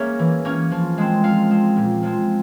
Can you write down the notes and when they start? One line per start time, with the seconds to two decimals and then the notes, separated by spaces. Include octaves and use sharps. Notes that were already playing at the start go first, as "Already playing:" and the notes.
Already playing: A#3 C#4 G#4 A#4 C#5 E5
0.19 E3
0.45 A#3 C#4
0.71 F3
0.98 G#3 C4
1.24 F3 F5
1.50 G#3 C4
1.76 A#2
2.02 F3 G#3 C4